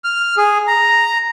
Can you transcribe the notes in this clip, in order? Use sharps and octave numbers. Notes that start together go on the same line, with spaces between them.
F6
G#4
A#5